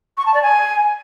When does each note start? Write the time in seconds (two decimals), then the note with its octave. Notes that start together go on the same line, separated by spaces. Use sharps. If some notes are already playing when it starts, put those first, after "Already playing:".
0.17 C#6
0.26 A5
0.34 D5
0.42 G#5